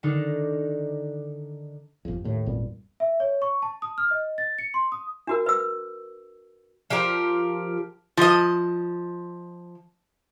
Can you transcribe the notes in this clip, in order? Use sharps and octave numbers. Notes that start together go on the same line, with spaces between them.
D3 D#3 D4 D#4
G1 F2
D#2 A2
G#1 E2 A#2 G3
E5
C#5
C#6
A5
D#6
F6
D#5
A6
C#7
C6
D#6
D4 F#4 A#4
B4 E6
F3 G4 A#4
F3 D#5